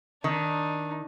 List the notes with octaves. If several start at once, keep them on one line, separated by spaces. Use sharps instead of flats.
D#3 D4 D#4